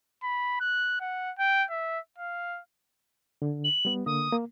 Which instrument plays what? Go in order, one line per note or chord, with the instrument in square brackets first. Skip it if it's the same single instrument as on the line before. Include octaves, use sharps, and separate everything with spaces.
[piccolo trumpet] B5
F#6
F#5
G5
E5
F5
[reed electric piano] D3
[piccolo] F#7
[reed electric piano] G3 B3
[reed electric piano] D3 A#3 [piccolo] D#6
[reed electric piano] A#3